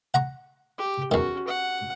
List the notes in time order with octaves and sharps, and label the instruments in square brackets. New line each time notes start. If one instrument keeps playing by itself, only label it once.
[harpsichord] F#5 A#5 C#6
[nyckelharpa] G4
[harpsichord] E2 D#3 [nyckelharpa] C#4 F#4
[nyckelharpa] F#5